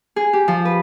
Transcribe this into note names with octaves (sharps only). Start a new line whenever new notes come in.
G#4
G4
F3
B4